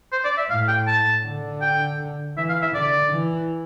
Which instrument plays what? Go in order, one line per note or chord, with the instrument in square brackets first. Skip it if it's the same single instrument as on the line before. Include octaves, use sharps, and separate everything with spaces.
[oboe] C5
D5
E5
[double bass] A2 [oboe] F5
[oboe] G5
A5
[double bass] D3
[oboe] G5
[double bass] E3 [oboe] E5
[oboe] F5
E5
[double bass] D3 [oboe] D5
[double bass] E3